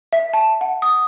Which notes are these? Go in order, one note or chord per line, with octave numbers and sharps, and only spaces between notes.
E5
A5
F#5
D#6